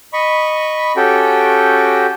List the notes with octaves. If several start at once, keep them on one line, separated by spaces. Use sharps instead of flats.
D#5 B5 C#6
C#4 F#4 G4 A4 G5